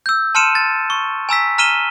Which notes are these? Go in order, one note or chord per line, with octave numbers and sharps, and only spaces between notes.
E6 G6
A5 C6 F6 C#7 D#7 E7
A6
C#6
G#5 A#5 E6 B6
A#5 F6 B6 D#7 E7 G7